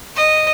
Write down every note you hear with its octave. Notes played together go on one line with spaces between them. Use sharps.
D#5